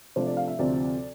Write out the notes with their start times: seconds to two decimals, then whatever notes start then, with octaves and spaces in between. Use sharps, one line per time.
0.16 C3 F3 A3 D4 C5
0.27 D5
0.37 F5
0.48 E5
0.59 D2 C3 F3 C4 D5